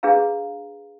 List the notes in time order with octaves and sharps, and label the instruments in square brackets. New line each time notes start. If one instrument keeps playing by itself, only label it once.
[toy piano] D4 G#4 B4 F5 A#5